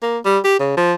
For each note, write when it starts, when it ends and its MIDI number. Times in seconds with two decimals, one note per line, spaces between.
0.02 0.18 58
0.25 0.38 55
0.44 0.59 67
0.59 0.76 49
0.77 0.93 53